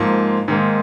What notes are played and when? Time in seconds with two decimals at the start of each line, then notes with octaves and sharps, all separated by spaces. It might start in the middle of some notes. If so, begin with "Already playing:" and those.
Already playing: G#2 F3 A#3 C6
0.48 G#2 D#3 A#3